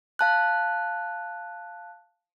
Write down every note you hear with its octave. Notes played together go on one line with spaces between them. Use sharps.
F5 A5 F#6